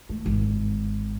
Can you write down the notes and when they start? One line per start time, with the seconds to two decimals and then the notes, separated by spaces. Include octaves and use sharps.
0.09 A3
0.26 G#1